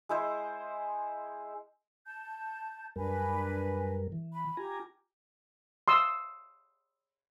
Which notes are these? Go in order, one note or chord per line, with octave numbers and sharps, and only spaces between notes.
G#3 E4 C5
A5 G6
F#2 G3 D4 A#4 B4 G#5
E3
B5
F4 G4 G#5 A#5
C6 D#6 E6